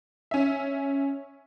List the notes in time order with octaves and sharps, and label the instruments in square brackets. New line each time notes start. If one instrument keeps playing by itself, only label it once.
[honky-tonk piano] C#4 E5